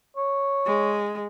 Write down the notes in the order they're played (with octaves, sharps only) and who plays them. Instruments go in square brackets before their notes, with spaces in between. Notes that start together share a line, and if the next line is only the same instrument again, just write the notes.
[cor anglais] C#5
[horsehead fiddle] G#3